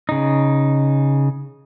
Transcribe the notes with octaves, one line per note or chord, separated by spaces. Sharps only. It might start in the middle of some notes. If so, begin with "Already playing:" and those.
C#3 D#4